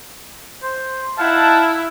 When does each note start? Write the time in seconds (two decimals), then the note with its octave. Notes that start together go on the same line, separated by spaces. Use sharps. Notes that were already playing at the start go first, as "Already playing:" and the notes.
0.62 C5
1.18 D#4 E4 F5 F#5 A5